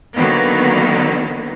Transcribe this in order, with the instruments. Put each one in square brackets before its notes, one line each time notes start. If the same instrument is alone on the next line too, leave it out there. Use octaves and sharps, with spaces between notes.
[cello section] D3 D#3 F#3 A#3 B3